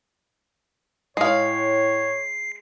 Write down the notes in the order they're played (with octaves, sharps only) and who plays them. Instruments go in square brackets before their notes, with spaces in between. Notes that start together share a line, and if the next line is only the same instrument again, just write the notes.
[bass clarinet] A2 [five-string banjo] G#3 F5 [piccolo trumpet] C#5 [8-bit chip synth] C7